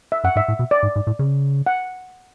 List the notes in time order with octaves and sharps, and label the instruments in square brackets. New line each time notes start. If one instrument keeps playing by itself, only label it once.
[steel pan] E5
[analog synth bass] F#2 [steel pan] F#5
[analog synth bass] G#2 [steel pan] E5
[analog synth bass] A2
B2
[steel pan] D5
[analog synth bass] G#2
G#2
A2
C#3
[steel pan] F#5